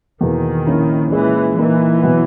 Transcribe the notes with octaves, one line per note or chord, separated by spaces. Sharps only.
E2 B2 D#3 A#3
A#1 A#2 A#3 C#4 E4
A#2 E3 G#3 C#4 E4
A#2 E3 A#3 D#4
B2 F#3 B3